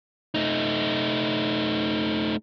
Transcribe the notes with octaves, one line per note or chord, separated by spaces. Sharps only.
A3 D#4